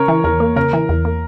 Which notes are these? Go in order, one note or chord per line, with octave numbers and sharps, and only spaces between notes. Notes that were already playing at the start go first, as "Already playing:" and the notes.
Already playing: C#3 A#4 C#5
E3
E2 A#4
A#3
C#3 A#4
E3
E2
A#3